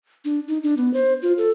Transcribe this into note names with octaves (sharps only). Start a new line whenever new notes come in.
D4
D#4
D4
B3
C5
F4
A4